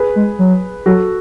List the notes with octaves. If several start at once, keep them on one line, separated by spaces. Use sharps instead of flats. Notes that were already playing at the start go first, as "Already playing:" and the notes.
Already playing: G#4 B4
G#3
F#3
F#3 F#4 A4